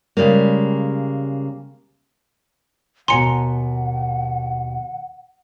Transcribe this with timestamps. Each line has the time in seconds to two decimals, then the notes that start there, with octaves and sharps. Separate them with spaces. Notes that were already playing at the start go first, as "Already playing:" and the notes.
0.17 C#3 G3 G#3 A#3
3.08 D#2 B2 F#5 G#5 A#5 C6 C#7